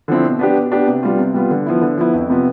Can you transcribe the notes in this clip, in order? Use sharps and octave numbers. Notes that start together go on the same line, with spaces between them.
D3 F3 C4 E4
B2
B3 D4 G4
B2
B3 D4 G4
C3
G3 B3 F4
C3
G3 B3 F4
D3
F3 B3 E4
D3
F3 B3 E4
F2
C3 F3 B3